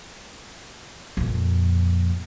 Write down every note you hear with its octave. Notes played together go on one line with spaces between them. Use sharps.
F2 A#2